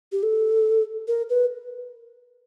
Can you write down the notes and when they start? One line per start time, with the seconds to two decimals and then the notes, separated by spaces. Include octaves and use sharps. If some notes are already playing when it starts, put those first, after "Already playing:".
0.12 G4
0.23 A4
1.08 A#4
1.30 B4